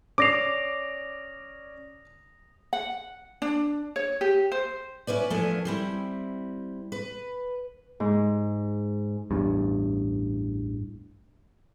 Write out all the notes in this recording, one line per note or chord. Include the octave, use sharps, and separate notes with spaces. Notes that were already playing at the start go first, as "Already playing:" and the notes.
C#4 D5 D6 D#6 A#6 C7 F7
F#5
D4
C#5
G4
C5
C#4 E4 B4 D5
E2 F3 A3 A#3 D4 G#5
G3 C4 E4
B4
G#2
A1 E2 G2